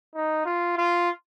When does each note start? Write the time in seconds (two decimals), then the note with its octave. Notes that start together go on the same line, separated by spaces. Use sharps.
0.15 D#4
0.46 F4
0.77 F4